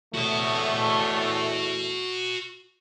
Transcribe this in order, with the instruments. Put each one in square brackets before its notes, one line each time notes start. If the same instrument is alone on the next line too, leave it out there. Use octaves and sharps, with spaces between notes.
[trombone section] E2 A2 A3 [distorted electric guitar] F#4 D#5